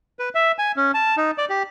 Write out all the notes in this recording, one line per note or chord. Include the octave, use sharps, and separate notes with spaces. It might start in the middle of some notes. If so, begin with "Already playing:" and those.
B4
E5
G#5
C#4
A5
D#4
D5
G4